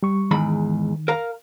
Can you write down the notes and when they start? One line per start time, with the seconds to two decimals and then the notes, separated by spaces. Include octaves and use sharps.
0.03 G3 C#6
0.31 E2 G#2 D#3 B5
1.08 A#4 F5 A#5